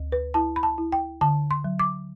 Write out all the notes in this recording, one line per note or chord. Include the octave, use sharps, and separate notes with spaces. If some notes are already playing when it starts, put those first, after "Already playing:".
Already playing: D2
B4
E4 A5
B5
A5
E4
G5
D3 A5
C6
F#3
D6